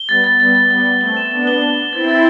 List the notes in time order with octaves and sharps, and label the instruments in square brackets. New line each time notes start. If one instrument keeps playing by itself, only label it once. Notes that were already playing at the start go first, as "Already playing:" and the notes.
Already playing: [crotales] G7
[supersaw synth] G3 B3 [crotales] A6
[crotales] A6
[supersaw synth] G3 B3 [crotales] A6
[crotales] A6
[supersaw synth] G3 B3 [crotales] A6
[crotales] A6
[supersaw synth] A3 C4 [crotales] G7
[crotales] E7
[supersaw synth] B3 D4 [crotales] A6
[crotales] G7
G7
G7
[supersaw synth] C4 E4 [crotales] A6
[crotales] A6